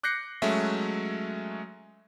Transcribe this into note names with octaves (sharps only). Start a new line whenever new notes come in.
D6 F#6 G6 A#6 C7 C#7
F#3 G#3 A3 C#4 E5